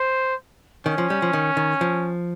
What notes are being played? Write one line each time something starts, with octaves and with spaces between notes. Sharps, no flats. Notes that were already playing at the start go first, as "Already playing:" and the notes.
Already playing: C5
D#3 C#4
F3
G3
F3
D#3
D#3
F3